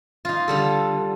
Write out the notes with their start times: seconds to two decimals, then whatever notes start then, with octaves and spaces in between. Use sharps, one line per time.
0.25 D#4 F4
0.48 D3 G3 A4